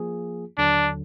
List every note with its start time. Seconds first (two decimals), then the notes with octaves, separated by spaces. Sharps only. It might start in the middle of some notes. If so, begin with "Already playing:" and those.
Already playing: F3 A#3 F4 G#4
0.58 D#2 D3 F#3 D4